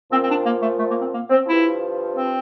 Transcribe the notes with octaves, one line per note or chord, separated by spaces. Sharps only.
A#2 F3 C4
C4
D4
A#3
A3
A3
A#3
C4
A#3
C4
G2 F3 E4
C4